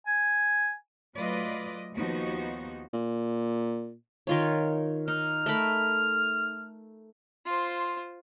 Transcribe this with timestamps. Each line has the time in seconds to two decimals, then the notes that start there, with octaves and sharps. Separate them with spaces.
0.06 G#5
1.15 F#3 A3 F4 B4 D5 D#5
1.96 D#2 F3 B3 D#4 F#4
2.93 A#2
4.27 D#3 F4 C#5
5.08 D#4 F6
5.46 A3 A#4 B5
7.46 F4 C5